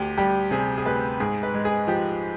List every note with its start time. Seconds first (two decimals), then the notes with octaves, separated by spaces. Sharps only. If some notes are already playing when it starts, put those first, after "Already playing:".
Already playing: D2 G4
0.18 G3 G4
0.51 C3 G#4
0.78 G#4
0.85 D2 B4
1.20 G#2 G#4
1.43 B4
1.54 G#3
1.65 G#4
1.87 F3 G4